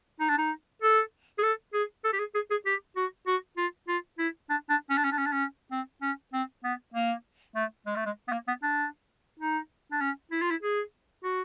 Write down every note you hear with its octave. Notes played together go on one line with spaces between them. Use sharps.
D#4
D4
D#4
A4
G#4
A4
G#4
A4
G4
G#4
G#4
G#4
G4
F#4
F#4
F4
F4
E4
D4
D4
C#4
D4
C#4
D4
C#4
D4
C#4
C4
C#4
C4
B3
A#3
A3
G#3
A3
G#3
B3
A#3
B3
D4
D#4
D4
C#4
E4
F4
E4
G#4
F#4